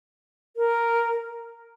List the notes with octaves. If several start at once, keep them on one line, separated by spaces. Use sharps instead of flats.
A#4